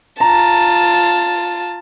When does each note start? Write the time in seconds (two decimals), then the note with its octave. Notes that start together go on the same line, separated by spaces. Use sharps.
0.20 F4 A5 A#5